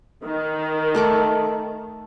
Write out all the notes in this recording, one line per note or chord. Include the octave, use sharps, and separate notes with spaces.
D#3
A3 A4 D6